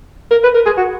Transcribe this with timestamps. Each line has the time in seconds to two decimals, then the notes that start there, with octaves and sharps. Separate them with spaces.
0.31 A#4
0.44 B4
0.54 A#4
0.66 G#4
0.77 F#4